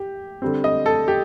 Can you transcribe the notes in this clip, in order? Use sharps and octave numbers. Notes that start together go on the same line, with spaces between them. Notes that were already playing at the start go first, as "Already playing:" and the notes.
Already playing: G4
D3 G3 C4
D#5
A4
G4